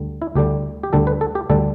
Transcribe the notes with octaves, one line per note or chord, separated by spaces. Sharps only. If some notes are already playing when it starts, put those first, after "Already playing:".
Already playing: D2 D3 G3
E4
D2 D3 G3 G4
G4
D2 D3 G3 A4
B4
A4
G4
D2 D3 G3 A4